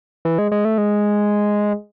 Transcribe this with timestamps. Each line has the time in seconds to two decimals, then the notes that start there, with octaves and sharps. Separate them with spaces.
0.25 E3
0.38 G#3
0.52 G#3
0.65 A3
0.78 G#3